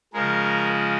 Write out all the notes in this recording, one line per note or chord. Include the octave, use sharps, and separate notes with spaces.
C#3 F3 G#3 A#4